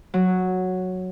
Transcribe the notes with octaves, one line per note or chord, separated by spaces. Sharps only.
F#3